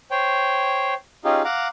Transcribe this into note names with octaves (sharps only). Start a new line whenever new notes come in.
C5 C#5 G5
C#4 D#4 F4 G4 G#4
F5 F#5 A#5 D6